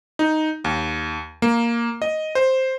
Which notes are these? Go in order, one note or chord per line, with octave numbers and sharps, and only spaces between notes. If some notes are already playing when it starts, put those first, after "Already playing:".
D#4
D#2
A#3
D#5
C5